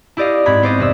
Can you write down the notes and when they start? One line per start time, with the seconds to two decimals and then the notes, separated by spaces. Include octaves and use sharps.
0.17 E4 G4 D5 D#5 F5
0.46 G#2 C4 E4 B5 F#6 G#6
0.62 B3 C5 D5 D#5
0.78 F1 B4 E5